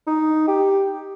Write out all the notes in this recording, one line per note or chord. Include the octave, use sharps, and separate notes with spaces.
D#4
G4